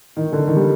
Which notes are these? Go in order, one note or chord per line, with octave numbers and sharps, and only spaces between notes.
D#3
D3
D#3
G3